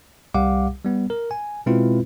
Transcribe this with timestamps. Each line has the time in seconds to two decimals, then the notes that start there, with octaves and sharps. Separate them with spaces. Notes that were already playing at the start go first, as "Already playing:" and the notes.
0.34 C2 G3 G4 F5 F#5 D6
0.84 G3 B3
1.10 A#4
1.31 G#5
1.66 B2 G#3 C4 E4 F4 B4